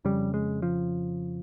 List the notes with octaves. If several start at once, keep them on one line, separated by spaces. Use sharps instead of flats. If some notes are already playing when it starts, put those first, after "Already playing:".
F2 C#3 G3
G#3
F3